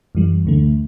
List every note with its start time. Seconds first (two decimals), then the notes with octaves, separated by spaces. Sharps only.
0.15 F#2 E3 G3
0.45 D2 D3 A3